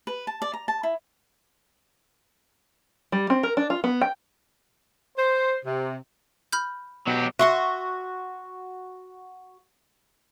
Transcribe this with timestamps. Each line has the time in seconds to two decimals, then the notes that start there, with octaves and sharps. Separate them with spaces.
0.07 B4
0.27 A5
0.42 D5
0.54 A#5
0.68 A5
0.83 E4
3.12 G3
3.30 C4
3.43 A#4
3.57 D4
3.70 F4
3.84 B3
4.01 G5
5.18 C5
5.65 C3
6.52 B5 F6 G6
7.07 B2 F#3 G4
7.39 F#4 E5 C6 C#6